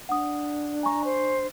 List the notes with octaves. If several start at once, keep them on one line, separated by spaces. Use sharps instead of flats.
D4 F#5 D#6
G#5 A#5 C#6
C5